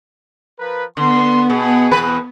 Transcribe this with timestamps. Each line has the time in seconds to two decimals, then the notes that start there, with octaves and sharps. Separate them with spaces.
0.59 F3 A#4 B4
0.97 D3 B3 C6
1.50 B2 G#4
1.91 E2 B2 B4